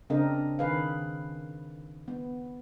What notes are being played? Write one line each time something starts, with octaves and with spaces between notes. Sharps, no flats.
C#3 C4 D4 A#4 D#5
D#3 G#4 B4 F5
B3